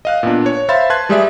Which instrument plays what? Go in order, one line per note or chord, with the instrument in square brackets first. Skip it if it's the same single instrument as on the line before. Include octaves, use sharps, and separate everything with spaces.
[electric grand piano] D#5 F5 F#6
A#2 B3 D4
C#5
C5 E5 F5 B5 C6 A6
B4 A5 C6 F#6 G#6
G3 G#3 G4 G#4 D5 E5